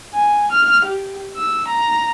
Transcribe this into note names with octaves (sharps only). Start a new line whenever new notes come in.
G#5
F6
G4
E6
A#5